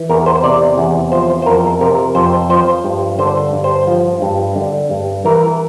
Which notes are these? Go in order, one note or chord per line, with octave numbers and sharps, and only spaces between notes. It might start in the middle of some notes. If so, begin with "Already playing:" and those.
Already playing: E3
E2 A#4
C5
C3 D5
E2
F3 C5
C5
F2 A#4
C3 A#4
F2 C5
F3 C5
G2
D3 C5
G2
C5
F3
G2
D3
G2
E3 A#4